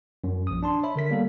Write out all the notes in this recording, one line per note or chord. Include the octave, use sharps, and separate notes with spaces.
F#2
A#1 D#6
D4 A5 C6
C#5 E5 B5
D3 A#4 B6
G3 A#3 B3 A4